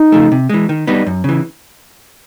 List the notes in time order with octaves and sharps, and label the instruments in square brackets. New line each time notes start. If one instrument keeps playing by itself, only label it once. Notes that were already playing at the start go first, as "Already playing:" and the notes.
Already playing: [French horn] D#4
[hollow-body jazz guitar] C#3 F3 A3
C3
E3 G#3
D#3
G3 B3 D#4
F#2
C#3 E3